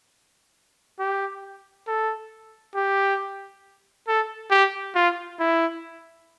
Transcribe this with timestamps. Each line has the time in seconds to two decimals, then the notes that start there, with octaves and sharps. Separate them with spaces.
0.99 G4
1.88 A4
2.75 G4
4.08 A4
4.51 G4
4.96 F4
5.40 E4